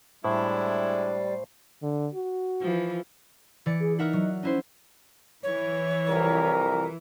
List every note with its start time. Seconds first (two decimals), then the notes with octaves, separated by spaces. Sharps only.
0.24 A2 G3 G#3 D4 E4 C5
1.82 D3
2.14 F#4
2.61 E3 F3
3.66 E3 D5 C#7
3.80 G#4
3.99 D#4 A#4 E5 F#5
4.13 F#3
4.43 C#4 D#4 E4 C5
5.43 E3 C#5
6.09 C2 F2 A#4